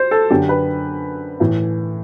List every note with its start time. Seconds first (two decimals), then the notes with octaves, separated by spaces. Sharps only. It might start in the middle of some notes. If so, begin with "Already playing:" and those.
Already playing: C5
0.11 A4
0.30 F#2 D3 G4
0.49 B4
1.40 A2 E3